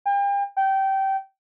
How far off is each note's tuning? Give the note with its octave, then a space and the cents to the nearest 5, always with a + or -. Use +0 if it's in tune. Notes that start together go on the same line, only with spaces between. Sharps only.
G5 +40
G5 -20